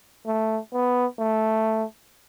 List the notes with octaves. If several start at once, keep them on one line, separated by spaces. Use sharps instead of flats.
A3
B3
A3